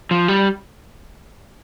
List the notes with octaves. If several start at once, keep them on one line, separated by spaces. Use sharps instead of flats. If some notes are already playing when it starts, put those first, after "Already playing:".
F3
G3